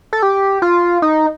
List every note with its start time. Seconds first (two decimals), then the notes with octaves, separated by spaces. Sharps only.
0.13 A4
0.23 G4
0.62 F4
1.02 D#4